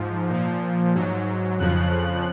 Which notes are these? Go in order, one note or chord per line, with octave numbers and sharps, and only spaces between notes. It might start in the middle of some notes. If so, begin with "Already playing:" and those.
Already playing: G#2 F3
A#2 F3
G#2 F#3
F2 C#3 F3 F#6